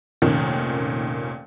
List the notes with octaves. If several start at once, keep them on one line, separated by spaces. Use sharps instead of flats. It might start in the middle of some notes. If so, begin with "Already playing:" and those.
F1 A#2 D#3 C#4